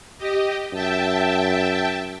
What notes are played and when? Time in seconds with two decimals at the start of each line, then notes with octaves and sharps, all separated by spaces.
0.18 G4 D#5
0.72 F#2 E5 G5 A5